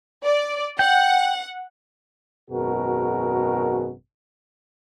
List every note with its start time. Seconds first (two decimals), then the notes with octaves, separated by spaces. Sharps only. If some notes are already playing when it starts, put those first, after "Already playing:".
0.23 D5
0.79 F#5 G5
2.50 G#1 F#2 B2 F#4 G#4 A#4